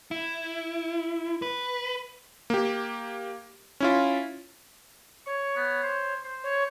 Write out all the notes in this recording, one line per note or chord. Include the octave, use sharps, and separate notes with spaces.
E4
B4
A#3 G4
C#4 E4 F4
C#5 C#6
B3
C5
C5
C#5